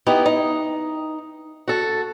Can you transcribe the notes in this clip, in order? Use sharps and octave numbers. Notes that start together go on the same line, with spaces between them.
B3 D#4 E4 G4
D#4
F#4 A4